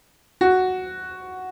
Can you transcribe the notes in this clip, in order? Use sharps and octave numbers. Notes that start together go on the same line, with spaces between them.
F#4